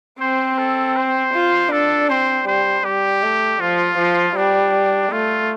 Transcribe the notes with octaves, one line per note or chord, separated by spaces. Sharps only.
C4 C5
A4
C5
F4
D4 A4
C4 C5
G3 C5
G3 G4
A3
F3 F4
F3
G3 D4
A3 F4